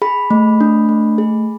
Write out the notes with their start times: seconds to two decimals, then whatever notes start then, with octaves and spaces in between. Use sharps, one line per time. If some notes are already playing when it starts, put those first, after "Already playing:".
0.02 G#4 B5
0.31 A3
0.61 D4
0.89 A3
1.18 G#4